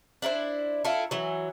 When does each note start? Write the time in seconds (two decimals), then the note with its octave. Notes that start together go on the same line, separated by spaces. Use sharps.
0.22 D4 E4 A#4 C5
0.84 E4 F4 A4
1.11 E3 F#3